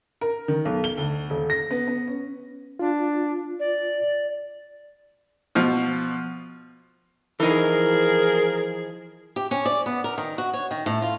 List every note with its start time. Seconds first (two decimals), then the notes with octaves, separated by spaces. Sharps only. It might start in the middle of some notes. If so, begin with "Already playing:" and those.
0.21 A#4
0.48 D#3
0.65 B1
0.84 G7
0.98 D2
1.30 D#1
1.50 A#6
1.71 B3
1.88 B3
2.08 C#4
2.79 D4 F4
3.59 D5
5.55 B2 F3
7.40 E3 F3 D#4 G#4 A#4
9.36 G4
9.51 C#4
9.66 D5
9.86 B3
10.04 A#4
10.18 D#3
10.38 F#4
10.53 C#5
10.71 D#3
10.86 A2
11.02 F4